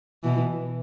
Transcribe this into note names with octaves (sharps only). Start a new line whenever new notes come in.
B2 E3